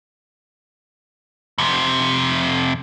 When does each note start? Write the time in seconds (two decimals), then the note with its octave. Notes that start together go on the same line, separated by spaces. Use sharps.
1.58 F2 C3